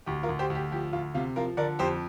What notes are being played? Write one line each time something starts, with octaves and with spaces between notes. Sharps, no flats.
D2 G4
F4 A#4
D2
G4 C5
D2
G4
F3 G4
D2 F4
C3 F4
F3 F4 A#4
D3 A#4 D5
F2 G4 C5